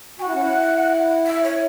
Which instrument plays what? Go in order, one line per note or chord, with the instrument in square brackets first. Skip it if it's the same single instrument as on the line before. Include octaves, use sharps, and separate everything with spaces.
[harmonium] F#4 [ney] G#5
[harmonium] E4 [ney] F#5
[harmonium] C#4
E4
[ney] E5
C#5